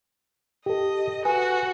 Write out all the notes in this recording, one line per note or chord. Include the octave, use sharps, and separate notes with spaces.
G4 A4 D#5
F#4 B4 G#5